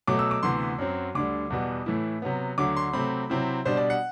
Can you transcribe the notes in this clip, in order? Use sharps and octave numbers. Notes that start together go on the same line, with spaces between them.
B2 F#3 A3 D6
E6
D6
D2 C3 E3 B3 C6
F#2 F#3 C4
D2 D3 G3 D6
E2 B2 G3 B3
A2 E3 A3 E4
C3 F#3 B3
D2 D3 F#3 A3 D6
C6
C3 F#3 A3 C4 B5
C3 F#3 C4 E4
B2 G3 D4 C5
D5
F#5